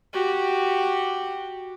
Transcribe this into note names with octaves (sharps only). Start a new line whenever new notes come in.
F#4 G4